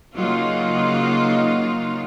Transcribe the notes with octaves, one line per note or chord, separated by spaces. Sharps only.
C#3 F#3 A#3 D#4 F4